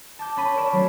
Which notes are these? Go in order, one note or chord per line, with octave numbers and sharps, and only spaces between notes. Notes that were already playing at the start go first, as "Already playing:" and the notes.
A5 D6 G6
C#4 B5 D#7
A#4 C#5 D5 D7 E7
F#3 A3 C4 C#4